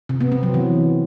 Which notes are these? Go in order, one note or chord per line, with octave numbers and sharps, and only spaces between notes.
C3
B3
C4
F#3
E3